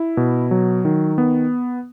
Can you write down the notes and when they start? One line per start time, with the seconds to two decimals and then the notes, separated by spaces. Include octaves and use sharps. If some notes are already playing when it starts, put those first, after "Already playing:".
Already playing: E4
0.17 B2
0.51 F#3
0.85 D#3
1.18 B3